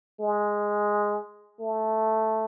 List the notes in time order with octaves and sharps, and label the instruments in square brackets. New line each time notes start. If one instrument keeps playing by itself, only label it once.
[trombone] G#3
A3